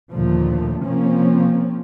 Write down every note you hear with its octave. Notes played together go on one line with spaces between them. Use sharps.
D#2 A#2 D3 F3 A3
C3 F3 A#3 C4 C#4